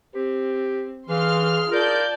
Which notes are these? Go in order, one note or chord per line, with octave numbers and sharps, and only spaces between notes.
C4 G4
E3 G#4 F5 C6 F6
F4 A#4 D5 A5 G6